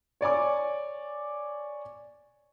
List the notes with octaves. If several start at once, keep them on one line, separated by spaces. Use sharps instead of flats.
C#5 D5 G#5 D6